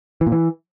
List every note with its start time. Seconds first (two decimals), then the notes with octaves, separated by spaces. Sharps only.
0.21 E3
0.27 A#2
0.32 E3